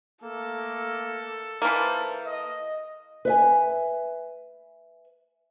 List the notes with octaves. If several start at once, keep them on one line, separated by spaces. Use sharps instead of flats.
A3 A#3 A4
E3 A#3 C5 A5
D#5
B4 E5 G#5